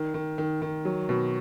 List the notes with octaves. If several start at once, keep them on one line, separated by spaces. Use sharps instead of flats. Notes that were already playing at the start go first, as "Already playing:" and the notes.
Already playing: D#3
D#3
D#3
D#3
F#3
B2